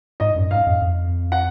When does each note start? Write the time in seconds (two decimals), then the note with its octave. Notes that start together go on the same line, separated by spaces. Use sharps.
0.20 G#2 D#5
0.35 F#2
0.51 G#2 F5
0.66 F2
0.82 F2
1.32 F#5